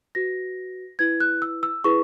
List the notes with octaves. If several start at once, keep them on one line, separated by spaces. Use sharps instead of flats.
F#4 B4 A#6
E4 B4 G#6
F#6
E6
E6
E4 G#4 B4 C#6